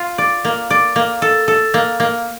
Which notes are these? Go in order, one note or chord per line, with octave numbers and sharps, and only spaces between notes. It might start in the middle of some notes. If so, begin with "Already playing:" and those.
Already playing: F4
D5
A#3
D5
A#3
A4
A4
A#3
A#3